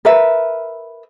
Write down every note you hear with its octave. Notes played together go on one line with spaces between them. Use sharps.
A#4 B4 E5